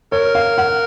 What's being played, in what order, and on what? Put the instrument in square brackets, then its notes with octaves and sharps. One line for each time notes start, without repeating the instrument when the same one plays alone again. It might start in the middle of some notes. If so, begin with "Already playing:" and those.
[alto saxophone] A#4 [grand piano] C#5
[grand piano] F5
F#5